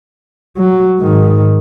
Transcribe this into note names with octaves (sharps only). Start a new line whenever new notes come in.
F#3
G#2 D#3